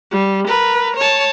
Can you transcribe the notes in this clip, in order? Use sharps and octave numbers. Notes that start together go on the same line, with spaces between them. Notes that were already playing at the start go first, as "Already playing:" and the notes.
G3
A#4 B4
C#5 A5